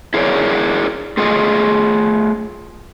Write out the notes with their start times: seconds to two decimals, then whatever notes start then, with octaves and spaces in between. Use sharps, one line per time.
0.14 E4 G#4 A#4 B4 C#5 D5
1.17 A3 F4 G#4 D#5